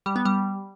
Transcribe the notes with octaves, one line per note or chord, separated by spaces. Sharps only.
G3
B3
G3